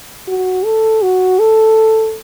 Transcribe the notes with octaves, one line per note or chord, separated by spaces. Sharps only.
F#4
A4
F#4
A4